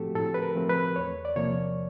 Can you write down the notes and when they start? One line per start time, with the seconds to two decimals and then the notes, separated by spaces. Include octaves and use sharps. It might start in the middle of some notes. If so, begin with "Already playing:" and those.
Already playing: A2 F3 A3 C4 F#4 G4 A4
0.15 A2 A4
0.34 B4
0.42 A#4
0.56 F3 A3 C4
0.69 B4
0.96 E2 C#5
1.25 D5
1.36 C3 F3 A#3 C#5